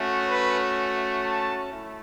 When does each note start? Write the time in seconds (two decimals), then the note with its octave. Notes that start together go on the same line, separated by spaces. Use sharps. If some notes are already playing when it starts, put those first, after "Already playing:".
Already playing: A3 C#4 F#4
0.28 B4
1.23 A5
1.72 A3 E4